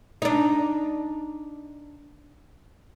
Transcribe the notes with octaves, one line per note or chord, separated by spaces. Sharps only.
D4 D#4